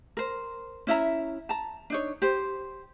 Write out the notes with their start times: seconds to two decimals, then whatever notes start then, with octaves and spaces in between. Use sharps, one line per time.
0.17 A#4 C5
0.87 C#4 E4 E5 A#5
1.49 A5 A#5
1.90 D4 D#4 C#5
2.22 G4 C5